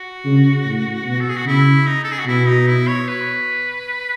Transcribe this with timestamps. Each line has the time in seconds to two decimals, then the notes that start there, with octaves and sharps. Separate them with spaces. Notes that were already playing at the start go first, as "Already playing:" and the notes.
Already playing: F#4
0.25 C#3
0.65 A2
1.05 B2
1.20 A4
1.29 G#4
1.37 F#4
1.45 C#3 E4
1.87 D#4
2.04 A4
2.11 G#4
2.19 F#4
2.26 B2 E4
2.47 D#4
2.67 E4
2.88 C#5
3.08 B4